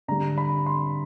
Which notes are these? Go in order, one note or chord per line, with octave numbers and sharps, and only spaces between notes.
D3 G3 A#5
B5
C6